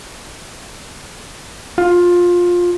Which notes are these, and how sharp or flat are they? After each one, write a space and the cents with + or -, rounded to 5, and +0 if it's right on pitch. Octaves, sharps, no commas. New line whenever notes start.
F4 +15